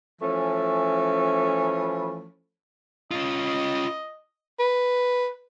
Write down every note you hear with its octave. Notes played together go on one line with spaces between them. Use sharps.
E3 F3 A3 C#4
C#4 F4 D#5
B4